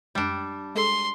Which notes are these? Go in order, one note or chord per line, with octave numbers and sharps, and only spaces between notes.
F#2 G3 G#3 D4
G#3 G#4 A4 C6